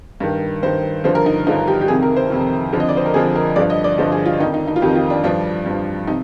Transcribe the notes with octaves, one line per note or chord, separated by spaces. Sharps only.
G2 D#3
G2 D#3 C5
G2 D3 F3 C5
A#4
D#4
G2 D3 F3 D#4
G4
G4
F2 C3 D#3 G#4
A#4
C5
F2 C3 D#3
F2 D3 F3
D#5
D5
C5
A#4
F2 D3 F3 G#4
A#4
G2 D3 F3 D5
D#5
D5
G2 D3 F3 C5
G#4
F4
F2 D#3 D#4
D#4
D#4
F4
F2 D#3 G4
F4
D4
G2 F3 D4
G2 F3
C3 D#4